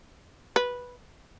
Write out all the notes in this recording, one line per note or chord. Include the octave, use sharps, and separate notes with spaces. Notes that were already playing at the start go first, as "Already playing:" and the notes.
B4